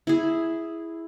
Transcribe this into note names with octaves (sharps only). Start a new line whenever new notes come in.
E4 G#4